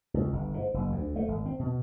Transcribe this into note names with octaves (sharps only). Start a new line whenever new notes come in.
C#2
G1
G#2
F#1
D2
A3
G#1
C4
B2